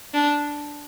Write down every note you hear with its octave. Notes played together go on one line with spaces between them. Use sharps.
D4